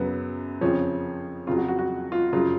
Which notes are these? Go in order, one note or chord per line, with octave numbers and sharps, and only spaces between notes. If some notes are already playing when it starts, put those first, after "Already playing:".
Already playing: F#2 C#3 F#3 B3
F2 C#3 F3 C#4
F2 C#3 F#3 F4
F#4
F#4
F#4
F4
F#2 C#3 F#3 F4